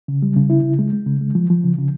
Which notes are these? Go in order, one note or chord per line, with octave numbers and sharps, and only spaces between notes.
C#3
G3
C#3
E4
C#3
G#3
G#3
C#3
G#3
F3
F3
C#3
C#3